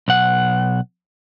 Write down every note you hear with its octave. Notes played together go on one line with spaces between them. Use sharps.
B1 F#5